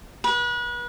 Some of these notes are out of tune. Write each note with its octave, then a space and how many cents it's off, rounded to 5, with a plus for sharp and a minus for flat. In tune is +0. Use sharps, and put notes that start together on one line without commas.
B4 -35